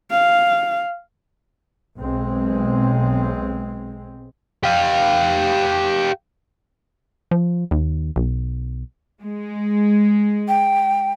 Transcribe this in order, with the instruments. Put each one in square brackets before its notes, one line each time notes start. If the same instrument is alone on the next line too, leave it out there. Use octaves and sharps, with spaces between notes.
[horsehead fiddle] F5
[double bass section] B1 G#3 C4
[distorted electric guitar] G4 F5
[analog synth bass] F3
D#2
B1
[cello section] G#3
[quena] G5